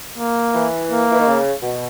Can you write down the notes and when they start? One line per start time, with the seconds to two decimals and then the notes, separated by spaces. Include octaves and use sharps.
0.18 A#3
0.54 E3
0.90 A#3
1.11 E3
1.19 D#3
1.27 C#3
1.62 B2